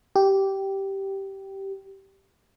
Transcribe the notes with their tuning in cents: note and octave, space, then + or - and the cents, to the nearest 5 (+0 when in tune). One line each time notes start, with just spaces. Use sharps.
G4 -10